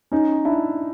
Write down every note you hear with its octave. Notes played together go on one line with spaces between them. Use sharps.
C#4 D#4
D4 E4